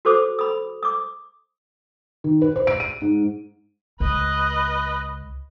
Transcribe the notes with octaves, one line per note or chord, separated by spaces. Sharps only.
F#4 A4 C5 D6 D#6
B5 D#6
D6 D#6
D#3
B4
C5
D7
D#7
G#2
C#2 B4 D#5